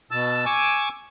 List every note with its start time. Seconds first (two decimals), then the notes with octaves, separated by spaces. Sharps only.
0.11 B2 A5 E6
0.46 G#5 C#6 D6 E6